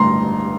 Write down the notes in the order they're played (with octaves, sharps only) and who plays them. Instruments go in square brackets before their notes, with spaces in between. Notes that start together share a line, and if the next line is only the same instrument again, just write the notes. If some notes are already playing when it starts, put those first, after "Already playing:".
Already playing: [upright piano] A1 G2 D3 A#5 C6